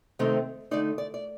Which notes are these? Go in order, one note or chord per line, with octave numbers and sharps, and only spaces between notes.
C3 D#3 A3 C4 D#4
D3 A3 D#4 D5
D5
D5